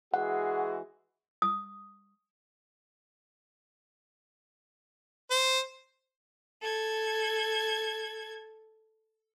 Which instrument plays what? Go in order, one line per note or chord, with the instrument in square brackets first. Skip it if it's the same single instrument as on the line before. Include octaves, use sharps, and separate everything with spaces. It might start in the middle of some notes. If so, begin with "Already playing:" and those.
[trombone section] E3 G#3 F#4 [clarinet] G#4 [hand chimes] F#5
[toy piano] D#6
[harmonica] C5
[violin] A4 G#6